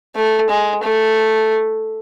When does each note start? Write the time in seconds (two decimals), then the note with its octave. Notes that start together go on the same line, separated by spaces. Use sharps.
0.16 A3
0.50 G#3
0.83 A3